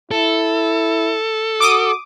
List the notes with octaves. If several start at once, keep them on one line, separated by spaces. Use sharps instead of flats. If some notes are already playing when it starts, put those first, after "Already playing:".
E4 A4
F#4 D6 D#6